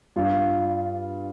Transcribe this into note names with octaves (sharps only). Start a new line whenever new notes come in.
G2 F4